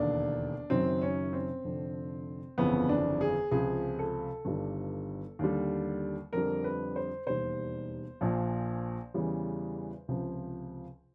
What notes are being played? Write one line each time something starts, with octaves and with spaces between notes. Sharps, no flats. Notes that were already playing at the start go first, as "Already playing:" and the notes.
Already playing: E1 D#2 D3 D4
F#1 F#2 D#3 F#3 C4
C#4
C4
F1 F2 D3
G1 F2 C#3 E3 B3
D4
G#4
C#2 C3 F3 G#4
A4
G1 G2 D#3 G3
D#2 D3 G3
F2 D3 G3 A#4
B4
C5
E1 D#2 D#3 G3 C5
A#1 A#2 F3
E2 C#3 E3 G3
C#2 C3 F3